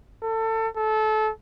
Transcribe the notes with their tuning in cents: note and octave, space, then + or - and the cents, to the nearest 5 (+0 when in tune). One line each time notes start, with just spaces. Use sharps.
A4 +25
A4 -25